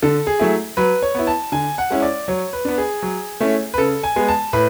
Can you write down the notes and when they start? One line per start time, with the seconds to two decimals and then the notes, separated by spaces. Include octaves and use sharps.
0.02 D3 A4
0.27 G#4
0.39 F#3 A3 E4
0.77 F#3 B4
1.02 C#5
1.15 B3 E4
1.27 A5
1.52 D3 G#5
1.78 F#5
1.90 G#3 C#4 E4
2.02 D5
2.28 F#3 C#5
2.53 B4
2.65 B3 D4
2.78 G#4
3.02 F#3
3.40 A3 C#4 E4
3.74 B4
3.78 C#3 A4
4.03 G#5
4.16 G#3 B3
4.28 A5
4.53 A2 B4